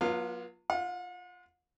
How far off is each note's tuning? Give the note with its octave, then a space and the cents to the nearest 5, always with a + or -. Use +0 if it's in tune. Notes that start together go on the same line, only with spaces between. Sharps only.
F#3 -30 B3 -45 F4 +0
F4 -10 F#5 -45